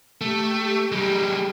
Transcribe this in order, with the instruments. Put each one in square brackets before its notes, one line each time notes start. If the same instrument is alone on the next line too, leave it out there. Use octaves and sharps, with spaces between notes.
[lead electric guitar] A3 [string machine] G4
[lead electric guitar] G3 G#3